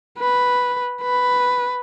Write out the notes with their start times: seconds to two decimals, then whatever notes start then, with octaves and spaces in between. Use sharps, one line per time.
0.19 B4
1.02 B4